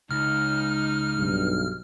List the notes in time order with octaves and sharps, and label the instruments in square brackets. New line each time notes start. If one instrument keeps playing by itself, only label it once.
[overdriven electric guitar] C#2 [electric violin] D#4 [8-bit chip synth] F6
[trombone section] B1 G2